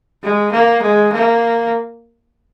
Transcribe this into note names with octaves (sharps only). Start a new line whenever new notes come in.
G#3
A#3
G#3
A#3